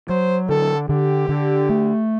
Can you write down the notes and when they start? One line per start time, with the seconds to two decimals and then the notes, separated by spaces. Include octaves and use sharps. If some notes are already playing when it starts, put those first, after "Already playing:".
0.09 F#3 C5
0.49 D3 A4
0.89 D3 G4
1.29 D3
1.69 A3